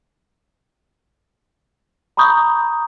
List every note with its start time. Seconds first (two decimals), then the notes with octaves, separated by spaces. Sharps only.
2.17 A#5 B5 C#6 D#6 G6